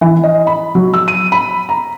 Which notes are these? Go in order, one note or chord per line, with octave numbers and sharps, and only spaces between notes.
E3
D#5
B5
F#3
E6
D#7
B5
A#5